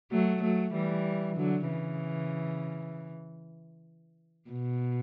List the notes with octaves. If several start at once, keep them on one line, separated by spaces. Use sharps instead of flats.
F#3 A3
F#3 A3
E3 G3
D3 F#3
C#3 E3
B2